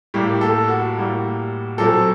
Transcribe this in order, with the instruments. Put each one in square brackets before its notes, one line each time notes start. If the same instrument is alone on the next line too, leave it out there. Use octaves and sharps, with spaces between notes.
[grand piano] A2 G3 A#3 G4
A4
F#4
A2 G3 A#3
A#2 F#3 C4 A4